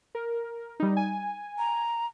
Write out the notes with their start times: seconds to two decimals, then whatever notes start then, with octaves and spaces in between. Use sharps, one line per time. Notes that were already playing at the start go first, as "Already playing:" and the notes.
0.15 A#4
0.80 G3 D#4
0.97 G#5
1.58 A#5